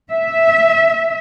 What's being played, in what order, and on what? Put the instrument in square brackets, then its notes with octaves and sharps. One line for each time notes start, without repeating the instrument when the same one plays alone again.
[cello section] E5